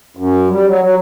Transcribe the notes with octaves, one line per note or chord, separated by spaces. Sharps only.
F#2
G3
F#3
F#3